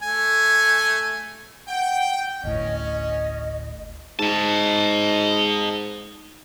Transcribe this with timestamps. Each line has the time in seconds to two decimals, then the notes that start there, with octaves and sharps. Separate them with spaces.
0.02 A3 G#5
1.68 F#5 G5
2.44 G1 D2 A2 C#4 D#5
2.85 D#5
4.19 G#2 D#5 A5